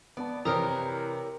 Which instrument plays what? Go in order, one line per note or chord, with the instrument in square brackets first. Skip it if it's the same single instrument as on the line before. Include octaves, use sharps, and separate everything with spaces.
[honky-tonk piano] B3 A5 [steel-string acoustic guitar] D5
[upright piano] C3 [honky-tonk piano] E3 B4 [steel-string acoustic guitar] G4 A#4 C#5 [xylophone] A#5 D#6